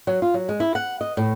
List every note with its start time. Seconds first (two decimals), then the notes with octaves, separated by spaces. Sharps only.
0.07 F#3
0.22 F4
0.34 F#3
0.49 G#3
0.60 E4
0.75 F#5
1.01 D#5
1.17 A2